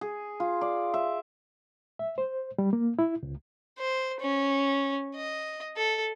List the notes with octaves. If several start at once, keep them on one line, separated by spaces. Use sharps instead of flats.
G#4
F4
D5
E5
E5
C5
G3
A#3
E4
C#2
C5
C#4
D#5
A4